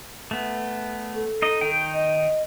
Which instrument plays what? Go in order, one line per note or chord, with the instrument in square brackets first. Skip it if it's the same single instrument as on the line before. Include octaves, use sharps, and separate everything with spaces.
[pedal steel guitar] A3 B3
[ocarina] A4
[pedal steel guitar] D#4 D#5
D#3 D#4 G5
[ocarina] D#5